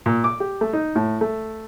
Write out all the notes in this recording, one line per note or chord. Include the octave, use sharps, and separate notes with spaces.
A#2
D6
G4
A3
D#4
A2
A3